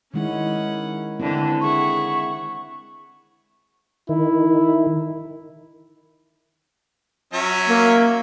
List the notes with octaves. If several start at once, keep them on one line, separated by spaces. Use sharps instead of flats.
D#3 G#3 C#4 E4 C#5 F#5
D3 E3 C4 E4
G#4 E5 F#5 C#6
D#3 E4
F#3 C#4 E5
A#3